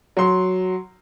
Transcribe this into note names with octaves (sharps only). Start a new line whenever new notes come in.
F#3 C6